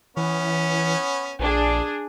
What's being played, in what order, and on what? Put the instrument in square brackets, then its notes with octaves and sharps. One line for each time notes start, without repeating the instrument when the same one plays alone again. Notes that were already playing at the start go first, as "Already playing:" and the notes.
[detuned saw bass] E3 [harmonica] B3 C#4
[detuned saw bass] A#1 [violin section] D4 G#4